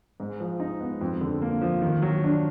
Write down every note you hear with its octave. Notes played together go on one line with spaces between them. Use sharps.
G#2
F3
D#4
B3
F2
D3
A#3
F3
D#3
F#3
D4